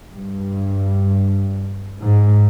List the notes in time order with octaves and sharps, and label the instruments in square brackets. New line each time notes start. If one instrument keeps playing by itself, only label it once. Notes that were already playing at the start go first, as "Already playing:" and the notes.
[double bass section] G2
G#2